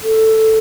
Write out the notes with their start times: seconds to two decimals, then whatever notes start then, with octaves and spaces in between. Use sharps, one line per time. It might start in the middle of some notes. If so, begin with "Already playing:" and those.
0.03 A4